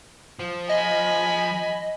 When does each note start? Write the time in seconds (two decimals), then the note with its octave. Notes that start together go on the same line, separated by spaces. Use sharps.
0.39 F3
0.69 D#5 G#5 B5